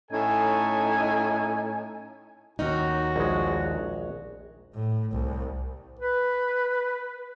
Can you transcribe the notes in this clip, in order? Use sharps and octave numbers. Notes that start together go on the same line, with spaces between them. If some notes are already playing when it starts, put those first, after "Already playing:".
A2 C#4 D#4 A4 G#5
D#2 C#4 D#4 F#4
A#1 G#3
A2
C2
B4